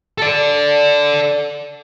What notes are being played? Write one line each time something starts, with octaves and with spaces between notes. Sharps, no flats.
A4 D5